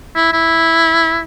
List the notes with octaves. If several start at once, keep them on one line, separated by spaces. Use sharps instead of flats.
E4
E4